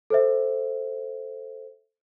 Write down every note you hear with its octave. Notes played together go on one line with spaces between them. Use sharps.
A4 C5 E5